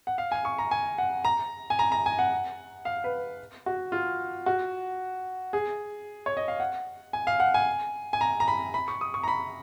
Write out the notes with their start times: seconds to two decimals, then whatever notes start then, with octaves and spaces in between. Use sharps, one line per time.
0.07 F#5
0.18 F5
0.32 G#5
0.45 C#6
0.58 A#5
0.71 G#5
0.98 F#5
1.25 A#5
1.70 G#5
1.79 A#5
1.92 A#5
2.06 G#5
2.19 F#5
2.85 F5
3.04 B4
3.66 F#4
3.92 F4
4.46 F#4
5.53 G#4
6.26 C#5
6.37 D#5
6.48 F5
6.60 F#5
7.13 G#5
7.27 F5
7.40 F#5
7.54 G#5
8.13 G#5
8.21 A#5
8.40 A#5
8.48 B5
8.74 B5
8.88 C#6
9.01 D#6
9.14 C#6
9.23 A#5
9.28 B5